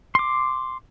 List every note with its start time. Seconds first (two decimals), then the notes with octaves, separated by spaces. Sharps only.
0.15 C6 D6